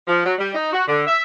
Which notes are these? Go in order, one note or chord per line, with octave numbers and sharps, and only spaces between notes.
F3
F#3
G3
D#4
F#4
D3
E5